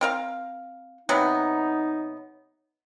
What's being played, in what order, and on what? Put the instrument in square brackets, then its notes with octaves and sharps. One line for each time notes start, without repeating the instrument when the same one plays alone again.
[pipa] C4 A#4 F5
[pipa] C3 F#3 B3 [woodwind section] D#4